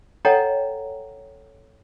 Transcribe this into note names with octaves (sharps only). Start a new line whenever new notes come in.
A4 C#5 D#5 F#5 G5 A#5